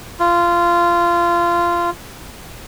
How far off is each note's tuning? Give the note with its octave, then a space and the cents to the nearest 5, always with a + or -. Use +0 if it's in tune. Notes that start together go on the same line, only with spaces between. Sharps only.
F4 -20